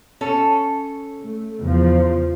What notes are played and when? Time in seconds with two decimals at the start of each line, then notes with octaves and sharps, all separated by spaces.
0.21 C#4 A4
1.17 A3
1.59 E2 C#3 F3